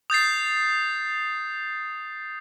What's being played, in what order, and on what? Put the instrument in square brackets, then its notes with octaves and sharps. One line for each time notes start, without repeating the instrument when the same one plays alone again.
[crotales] D#6 G6 A6 C7